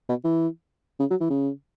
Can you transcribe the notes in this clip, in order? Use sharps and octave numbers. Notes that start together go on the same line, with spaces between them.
B2
E3
C#3
F#3
E3
C#3